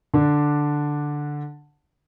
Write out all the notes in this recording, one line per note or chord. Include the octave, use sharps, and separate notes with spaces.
D3 D4